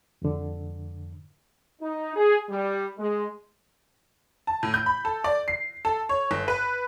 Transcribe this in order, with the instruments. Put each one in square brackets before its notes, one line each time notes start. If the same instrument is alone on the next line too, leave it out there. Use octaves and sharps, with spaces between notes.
[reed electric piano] F2 G#2 D3
[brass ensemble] D#4
G#4
G3
G#3
[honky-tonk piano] A5
A2
G6
B5
A4
D5
C7
A4
C#5
G1
B4